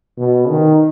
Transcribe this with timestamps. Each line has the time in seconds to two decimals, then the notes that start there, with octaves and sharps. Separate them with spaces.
0.18 B2
0.48 D#3